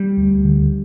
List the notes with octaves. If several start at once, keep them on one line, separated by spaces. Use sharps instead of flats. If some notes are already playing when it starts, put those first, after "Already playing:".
Already playing: G3
D2
D3